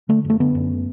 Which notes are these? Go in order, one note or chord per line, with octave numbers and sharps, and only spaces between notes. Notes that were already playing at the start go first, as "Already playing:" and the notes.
D3 A3
F#1
A3
D3 B3
F#2